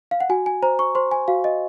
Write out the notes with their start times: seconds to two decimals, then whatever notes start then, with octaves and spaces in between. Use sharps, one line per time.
0.11 F5
0.20 F#5
0.30 F#4 G#5
0.46 G#5
0.63 C5 A#5
0.79 C#6
0.95 C5 C6
1.11 G#5
1.28 F#4 F5
1.44 D#5